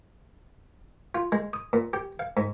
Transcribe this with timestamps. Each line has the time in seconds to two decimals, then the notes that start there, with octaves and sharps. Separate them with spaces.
1.15 F4
1.32 G#3
1.53 D#6
1.73 A#2
1.93 G4
2.19 F5
2.37 G#2